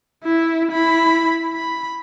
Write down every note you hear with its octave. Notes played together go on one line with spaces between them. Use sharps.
E4 E5
E4 B5
B5